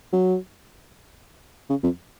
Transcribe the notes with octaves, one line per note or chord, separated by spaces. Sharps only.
F#3
C#3
F2